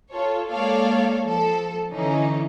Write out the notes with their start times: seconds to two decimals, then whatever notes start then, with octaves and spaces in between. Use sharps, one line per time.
0.11 F4 A4 C#5
0.50 G#3 A#3 A4 C#5 D5 F5
1.27 F3 A4
1.91 D3 E3 C#4 D#4